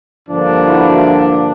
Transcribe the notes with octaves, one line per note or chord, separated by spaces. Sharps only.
G2 D3 F3 A#3 D4
E4 F#4